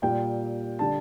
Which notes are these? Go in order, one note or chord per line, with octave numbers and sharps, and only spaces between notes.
A#2 G3 G5
D3 G3 A5